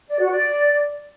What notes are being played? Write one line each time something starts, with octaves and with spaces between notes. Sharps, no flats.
D5
F#4
D5